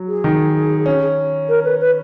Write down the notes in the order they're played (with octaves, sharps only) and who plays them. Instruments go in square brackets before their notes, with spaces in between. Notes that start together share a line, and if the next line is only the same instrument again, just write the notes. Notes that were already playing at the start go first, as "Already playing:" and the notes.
Already playing: [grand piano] F#3
[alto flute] G#4
[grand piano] D#3
C#4
[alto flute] A#4
B4
B4